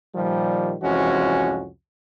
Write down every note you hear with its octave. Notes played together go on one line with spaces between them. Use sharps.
A#2 D#3 F3 G3
C2 F2 E3 G#3 C#4 F#4